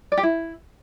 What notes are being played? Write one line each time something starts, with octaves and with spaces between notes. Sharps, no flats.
D5
G4
E4